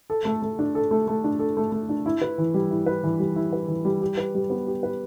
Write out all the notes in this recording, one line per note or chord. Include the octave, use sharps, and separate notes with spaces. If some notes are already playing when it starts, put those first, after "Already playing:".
A4
A3
A3
D4
A4
A3
A3
D4
A4
A3
A3
D4
E4
B4
E3
G3
E4
B4
E3
G3
E4
B4
E3
G3
G4
B4
G3
B3
G4
B4